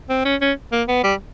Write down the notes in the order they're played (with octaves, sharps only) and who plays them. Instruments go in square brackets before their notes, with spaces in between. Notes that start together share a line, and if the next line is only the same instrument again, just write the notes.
[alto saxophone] C4
C#4
C#4
A#3
B3
G3